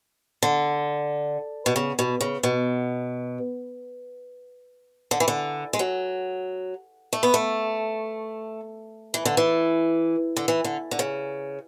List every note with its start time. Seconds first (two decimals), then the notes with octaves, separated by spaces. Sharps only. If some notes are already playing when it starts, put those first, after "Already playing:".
0.43 D3
1.66 B2
1.76 C#3
1.99 B2
2.21 C#3
2.43 B2
5.11 D3
5.20 E3
5.28 D3
5.73 G#3
5.79 F#3
7.13 A3
7.23 B3
7.34 A3
9.14 E3
9.25 D3
9.37 E3
10.37 D3
10.48 E3
10.64 D3
10.91 D3
10.99 C#3